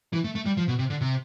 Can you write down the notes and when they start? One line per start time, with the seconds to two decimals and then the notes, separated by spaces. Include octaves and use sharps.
0.13 E3
0.24 A3
0.35 A3
0.46 G3
0.57 F3
0.68 B2
0.79 C3
0.90 D3
1.01 C3